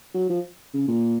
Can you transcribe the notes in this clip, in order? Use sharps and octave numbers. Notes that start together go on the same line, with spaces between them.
F#3
F3
C#3
A#2